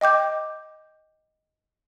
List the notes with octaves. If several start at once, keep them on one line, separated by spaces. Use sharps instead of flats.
D#5 G5 D6 G6